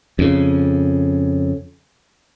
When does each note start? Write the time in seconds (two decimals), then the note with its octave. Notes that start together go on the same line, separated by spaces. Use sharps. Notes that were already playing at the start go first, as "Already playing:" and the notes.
0.19 F2 C#3